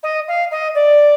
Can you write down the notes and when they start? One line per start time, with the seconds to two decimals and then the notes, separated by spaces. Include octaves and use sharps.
0.03 D#5
0.28 F5
0.51 D#5
0.75 D5